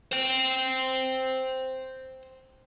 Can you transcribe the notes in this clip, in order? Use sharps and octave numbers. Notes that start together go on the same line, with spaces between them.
C5 G5